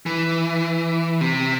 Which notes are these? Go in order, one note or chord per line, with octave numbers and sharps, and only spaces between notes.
E3
C3